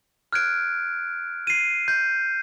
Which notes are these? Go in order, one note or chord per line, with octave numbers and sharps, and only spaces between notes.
F6 F#6 G#6 D7
C7 D#7
G6